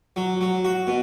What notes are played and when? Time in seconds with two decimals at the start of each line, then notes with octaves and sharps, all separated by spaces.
0.16 F#3
0.41 F#3
0.65 F#4
0.87 B2